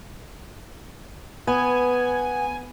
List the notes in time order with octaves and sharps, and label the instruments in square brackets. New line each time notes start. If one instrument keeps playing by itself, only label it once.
[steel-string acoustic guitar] B3 [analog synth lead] G#5